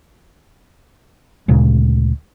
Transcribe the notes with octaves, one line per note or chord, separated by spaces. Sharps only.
D2 A#2 C#3 G#3